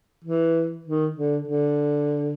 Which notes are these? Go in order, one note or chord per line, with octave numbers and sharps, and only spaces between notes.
E3
D#3
D3
D3